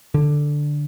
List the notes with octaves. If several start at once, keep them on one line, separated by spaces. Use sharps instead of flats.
D3